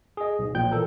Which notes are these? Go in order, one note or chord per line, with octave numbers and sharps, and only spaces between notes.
G#4 D#5
B1
A#2 F3 G5 G6
E3 A4 A#4